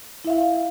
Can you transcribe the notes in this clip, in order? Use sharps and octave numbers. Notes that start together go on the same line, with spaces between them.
E4 E5 F5